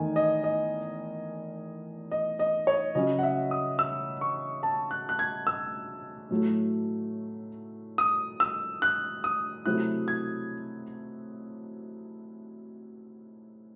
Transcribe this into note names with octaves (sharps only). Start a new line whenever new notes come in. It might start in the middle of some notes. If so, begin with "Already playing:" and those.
Already playing: E2 D#3 A3 D#4 G#5
D#5
D#5
D#5
D#5
C#5
C#3 F#3 C#4 D#5
F#5
E5
D#6
E6
C#6
A5
F#6
F#6
G#6
E6
A2 F#3 A3
D#6
E6
F#6
D#6
C3 F#3 A3 C4 E4 F#6
G#6